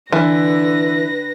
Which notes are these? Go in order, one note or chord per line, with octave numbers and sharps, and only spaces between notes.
D3 E3 B4 A#6